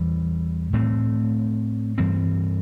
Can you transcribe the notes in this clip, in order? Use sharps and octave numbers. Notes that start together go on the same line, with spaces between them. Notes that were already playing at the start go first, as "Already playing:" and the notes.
Already playing: E2 E3 G3
A2 A3 C4
G2 E3 G3 C4